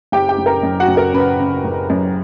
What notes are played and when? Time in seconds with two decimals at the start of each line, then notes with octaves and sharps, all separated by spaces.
0.12 F#1 G4 G5
0.29 G4 G5
0.38 F#1
0.46 A#4 A#5
0.63 F#2
0.80 F#4 F#5
0.88 F#1
0.97 A#4
1.14 C#3 B4
1.40 C#3
1.64 F#1
1.90 F#2